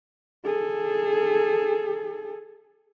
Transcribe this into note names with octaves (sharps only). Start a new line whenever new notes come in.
G#4 A4